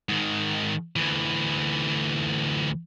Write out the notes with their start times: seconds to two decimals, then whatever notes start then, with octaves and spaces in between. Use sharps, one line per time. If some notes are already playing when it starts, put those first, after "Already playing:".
0.09 G#2 D#3
0.96 D2 E3